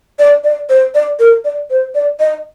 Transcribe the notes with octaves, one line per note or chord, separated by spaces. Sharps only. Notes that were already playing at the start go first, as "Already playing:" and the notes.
D5
D5
C5
D5
A#4
D5
C5
D5
D#5